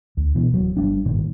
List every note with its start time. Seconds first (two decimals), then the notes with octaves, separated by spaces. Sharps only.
0.17 D2
0.35 B2 E3
0.52 D1 F#3
0.77 G1 G3 D4
1.05 G#1 G2 A#2 D#3